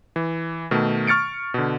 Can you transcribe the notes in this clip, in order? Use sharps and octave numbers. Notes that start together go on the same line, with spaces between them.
E3
B2 D#3 A3
C#6 F6 A6 C#7 D7
B2 D3